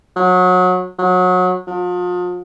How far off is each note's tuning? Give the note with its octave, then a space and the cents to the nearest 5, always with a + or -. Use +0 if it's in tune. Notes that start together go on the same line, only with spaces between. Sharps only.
F#3 -25
F#3 -25
F3 +40